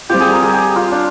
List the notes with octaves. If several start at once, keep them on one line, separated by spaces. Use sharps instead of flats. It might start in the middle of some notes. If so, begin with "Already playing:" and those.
G3 C4 F4 G4
G#4
A#4
G#4
G4
F4
D4